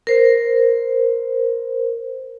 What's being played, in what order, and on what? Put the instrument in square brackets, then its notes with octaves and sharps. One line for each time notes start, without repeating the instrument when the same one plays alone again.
[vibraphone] A#4 C5